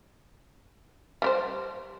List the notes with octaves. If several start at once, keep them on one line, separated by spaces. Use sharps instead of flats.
G3 G4 C5